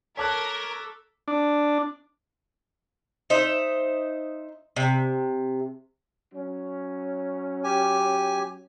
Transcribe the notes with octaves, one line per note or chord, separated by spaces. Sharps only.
A4 A#4 C#5 A5 D6 F#6 B6
D4
D#4 C5 E5
C3
F#3 C#4
G4 G#5